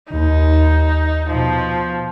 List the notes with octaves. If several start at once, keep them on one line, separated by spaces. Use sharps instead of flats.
D#2 D#4
B2 F3